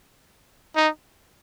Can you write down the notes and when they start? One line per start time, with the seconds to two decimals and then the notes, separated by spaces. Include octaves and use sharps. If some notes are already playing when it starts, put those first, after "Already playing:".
0.76 D#4